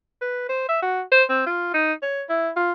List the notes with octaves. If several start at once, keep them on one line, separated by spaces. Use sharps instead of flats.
B4
C5
E5
F#4
C5
C4
F4
D#4
C#5
E4
F4